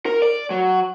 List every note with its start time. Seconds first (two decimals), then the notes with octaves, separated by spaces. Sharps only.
0.06 A#4
0.22 D5
0.50 F#3